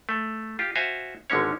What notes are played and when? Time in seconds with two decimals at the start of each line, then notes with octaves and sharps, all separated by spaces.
0.09 A3
0.59 F4 G4
0.75 F#4 C5 E5 F5 G#5
1.30 G#1 D3 G#3 C#4 C#5